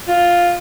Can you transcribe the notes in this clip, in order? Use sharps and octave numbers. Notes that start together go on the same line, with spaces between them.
F4